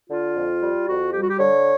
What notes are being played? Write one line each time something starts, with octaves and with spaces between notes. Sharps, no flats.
D3 F4
F2
G3
F2 F#4
G3 G4
F#4
G4
D3 C#5